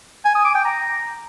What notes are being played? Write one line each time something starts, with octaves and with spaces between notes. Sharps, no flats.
G#5
D#6
D6
G5
A#5